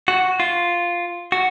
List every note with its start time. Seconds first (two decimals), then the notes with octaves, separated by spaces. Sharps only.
0.08 F#4
0.40 F4
1.32 F#4